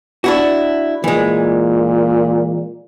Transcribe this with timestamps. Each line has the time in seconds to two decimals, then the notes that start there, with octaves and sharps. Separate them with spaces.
0.24 D4 E4 F#4
1.04 A#2 E3 G#3